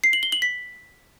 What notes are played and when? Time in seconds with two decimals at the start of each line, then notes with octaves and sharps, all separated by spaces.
0.04 C7
0.13 F#7
0.23 G7
0.32 F#7
0.42 B6